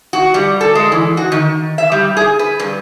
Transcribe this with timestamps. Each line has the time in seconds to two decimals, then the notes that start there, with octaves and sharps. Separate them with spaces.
0.13 F#4
0.34 G3
0.61 A4
0.75 G#3
0.92 E3
1.17 F#4
1.32 D#3
1.78 E5
1.92 G3
2.17 G#4
2.39 B4
2.60 G2